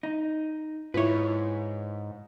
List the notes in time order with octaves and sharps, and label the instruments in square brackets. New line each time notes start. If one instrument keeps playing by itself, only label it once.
[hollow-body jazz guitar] D#4
[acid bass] G#2 [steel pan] E4 F4 [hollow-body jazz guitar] B4 C#5